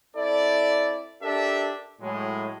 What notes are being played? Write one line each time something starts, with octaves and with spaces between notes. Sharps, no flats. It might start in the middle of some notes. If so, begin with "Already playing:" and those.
C4 E4 A4 D5
D4 G4 A4 A#4 D5 E5
A2 F#3 G#3